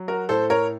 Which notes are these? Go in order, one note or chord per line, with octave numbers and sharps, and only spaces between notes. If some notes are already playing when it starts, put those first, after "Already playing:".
Already playing: F#3
F#4 A#4
A2 A4 C5
A#4 C#5